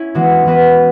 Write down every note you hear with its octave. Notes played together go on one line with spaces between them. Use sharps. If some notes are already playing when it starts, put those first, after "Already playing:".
Already playing: C#4 E4
E3 G#3 B3 F#4
E3 B3 F#4 B4